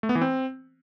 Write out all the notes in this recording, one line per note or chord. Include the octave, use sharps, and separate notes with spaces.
A3
B3
E3
C4